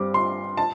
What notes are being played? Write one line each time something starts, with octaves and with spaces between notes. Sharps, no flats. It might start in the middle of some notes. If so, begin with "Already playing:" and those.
Already playing: G2 G3 C4 D6
C6
A5